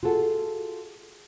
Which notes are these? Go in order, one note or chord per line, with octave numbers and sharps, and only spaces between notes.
F4 F#4 G#4 A4 F#5